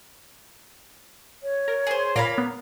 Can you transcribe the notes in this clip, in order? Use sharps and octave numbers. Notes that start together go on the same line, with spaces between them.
C#5
A#4
G#4 C5
A#2 A#3 F5 B5 A#6 C7
B3